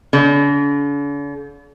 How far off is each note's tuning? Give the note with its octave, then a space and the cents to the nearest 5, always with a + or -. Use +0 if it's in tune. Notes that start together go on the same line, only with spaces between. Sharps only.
D3 -45